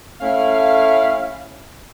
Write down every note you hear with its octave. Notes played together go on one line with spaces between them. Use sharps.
A3 C#4 E4 F5